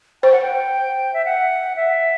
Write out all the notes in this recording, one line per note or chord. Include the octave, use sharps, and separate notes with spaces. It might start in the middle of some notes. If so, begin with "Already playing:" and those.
C5 G5
F#5
G5
E5
F#5
E5